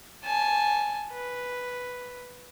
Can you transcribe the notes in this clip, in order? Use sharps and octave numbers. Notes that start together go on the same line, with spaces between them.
G#5 A5
B4